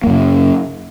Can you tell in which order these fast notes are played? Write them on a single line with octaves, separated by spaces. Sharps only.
A#3 F#2 C#3